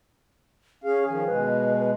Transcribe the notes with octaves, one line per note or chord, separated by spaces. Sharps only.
C#4 G#4 F5
D#3 F3 G#5
B2 G#3 B4
B4